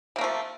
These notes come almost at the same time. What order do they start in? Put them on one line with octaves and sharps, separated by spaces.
C3 A#3 A3 F3